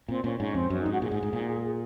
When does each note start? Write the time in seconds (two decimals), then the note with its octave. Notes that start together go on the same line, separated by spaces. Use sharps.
0.08 A#2 C4
0.24 A#2 C#4
0.39 G#2 C#4
0.55 F2 C4
0.70 F#2 C#4
0.81 D#4
0.86 G#2
0.91 F#4
1.01 A#2 G#4
1.11 G#2
1.23 G#2
1.33 A#2
1.64 G#4